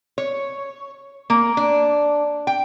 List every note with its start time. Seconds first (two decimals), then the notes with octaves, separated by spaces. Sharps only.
0.18 C#5
1.30 A#3
1.57 D4
2.47 G5